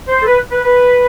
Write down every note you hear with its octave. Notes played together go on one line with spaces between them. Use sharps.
C5
A4
B4
B4
B4